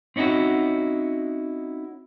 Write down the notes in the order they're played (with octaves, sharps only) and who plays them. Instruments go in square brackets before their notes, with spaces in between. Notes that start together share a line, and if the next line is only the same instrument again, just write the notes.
[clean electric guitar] C4 C#4 D#4 E4 F#4